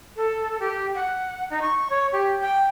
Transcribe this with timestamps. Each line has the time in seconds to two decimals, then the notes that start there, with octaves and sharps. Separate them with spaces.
0.16 A4
0.60 G4
0.95 F#5
1.50 D#4
1.62 C#6
1.90 C#5
2.12 G4
2.41 G5